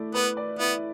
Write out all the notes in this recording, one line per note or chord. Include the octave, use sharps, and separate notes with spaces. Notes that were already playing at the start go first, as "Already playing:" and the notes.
Already playing: A3 E4 D5
B3 B4
D5
B3 E4